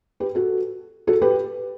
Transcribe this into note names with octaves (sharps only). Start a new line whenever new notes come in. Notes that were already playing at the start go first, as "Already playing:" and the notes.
G4 B4
F#4 A4
F#4 A4
G4 B4